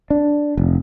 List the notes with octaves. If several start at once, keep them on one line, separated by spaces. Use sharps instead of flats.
D4
F1